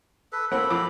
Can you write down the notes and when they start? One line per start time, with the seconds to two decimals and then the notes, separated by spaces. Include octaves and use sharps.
0.32 A4 B4
0.52 A#3 C4 A4 F#5 B5
0.70 F2 D6